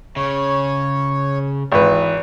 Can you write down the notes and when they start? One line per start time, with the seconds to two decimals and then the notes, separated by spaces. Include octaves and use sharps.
0.16 C#3 C#5
1.72 G#1 E3 B4